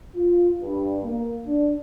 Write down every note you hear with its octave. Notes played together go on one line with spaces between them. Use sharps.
F4
G2
A#3
D4